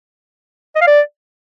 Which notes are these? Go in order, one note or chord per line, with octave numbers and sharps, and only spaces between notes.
D#5
F5
D5